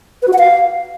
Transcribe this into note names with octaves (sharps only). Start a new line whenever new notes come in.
B4
F#4
F#5
F5